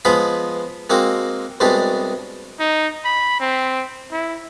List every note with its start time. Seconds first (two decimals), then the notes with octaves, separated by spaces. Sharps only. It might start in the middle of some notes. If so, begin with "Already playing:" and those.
0.05 F3 G#3 B3 G#4 B5
0.90 G#3 A#3 C4 F#4
1.60 C2 B2 G#3 D4 G4
2.60 D#4
3.05 B5
3.40 C4
4.12 E4